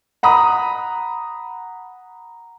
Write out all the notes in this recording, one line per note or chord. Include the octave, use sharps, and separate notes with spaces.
F#5 A#5 B5 D#6